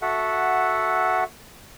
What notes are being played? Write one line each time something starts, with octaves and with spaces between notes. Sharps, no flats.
F#4 A4 E5 F#5